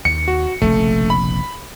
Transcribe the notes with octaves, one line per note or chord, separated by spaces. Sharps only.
D#2 C#7
F#4
F1 A#1 C#3 A3
B5